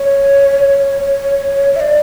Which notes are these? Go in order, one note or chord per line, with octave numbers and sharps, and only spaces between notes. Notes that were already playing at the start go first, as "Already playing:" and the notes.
Already playing: C#5
E5
D5